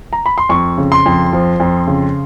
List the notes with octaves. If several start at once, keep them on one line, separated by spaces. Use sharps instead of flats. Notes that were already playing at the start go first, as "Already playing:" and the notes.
A#5
B5
C6
F2 C#6
C#3
C6
F2
F3
F2
C#3